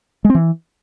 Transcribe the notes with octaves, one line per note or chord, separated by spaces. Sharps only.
G#3
C4
E3